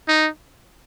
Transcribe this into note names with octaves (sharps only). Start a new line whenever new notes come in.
D#4